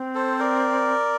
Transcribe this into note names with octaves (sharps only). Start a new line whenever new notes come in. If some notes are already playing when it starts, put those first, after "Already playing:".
Already playing: C4
A4 C5
A#4 D5